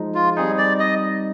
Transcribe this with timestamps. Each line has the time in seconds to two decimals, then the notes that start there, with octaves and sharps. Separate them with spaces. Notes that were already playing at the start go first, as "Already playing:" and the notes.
Already playing: F3 G#3 D#4
0.15 F4
0.37 G3 C4 D#4 G#4
0.58 D5
0.79 D#5